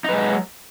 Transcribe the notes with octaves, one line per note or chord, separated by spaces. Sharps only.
F#3 G#3 D#4 B4